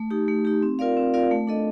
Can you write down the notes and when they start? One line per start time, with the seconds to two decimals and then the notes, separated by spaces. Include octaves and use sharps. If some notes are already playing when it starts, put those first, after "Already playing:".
Already playing: A3
0.11 D#4 G4
0.28 A3
0.45 D#4 G4
0.62 C4
0.79 F4 A#4 D5 F5
0.97 C4
1.14 F4 A#4 D5 F5
1.31 A3
1.47 D4 A4 D#5